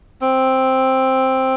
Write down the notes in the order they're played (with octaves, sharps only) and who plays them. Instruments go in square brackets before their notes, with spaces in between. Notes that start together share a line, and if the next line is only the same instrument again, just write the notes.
[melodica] C4